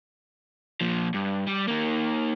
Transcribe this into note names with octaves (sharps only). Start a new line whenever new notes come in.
A#2 F3
G2
G3
D#3 A#3